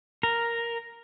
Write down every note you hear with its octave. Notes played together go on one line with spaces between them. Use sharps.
A#4